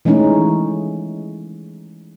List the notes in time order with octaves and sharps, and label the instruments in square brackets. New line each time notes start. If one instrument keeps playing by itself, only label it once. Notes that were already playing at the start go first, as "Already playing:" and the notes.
[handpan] E3 G#3 A3 C#4 D#4